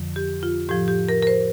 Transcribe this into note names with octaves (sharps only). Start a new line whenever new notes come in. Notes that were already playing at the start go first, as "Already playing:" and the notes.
Already playing: F2 D3 F3
G4
F4
A2 F3 G4
G4
A#4
A#4
C5